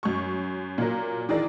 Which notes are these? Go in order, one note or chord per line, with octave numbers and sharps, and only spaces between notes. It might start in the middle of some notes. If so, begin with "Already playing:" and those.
F#2 C#6
A#2 F#3 A#4
D#3 E3 D4 G#4 A#4 D5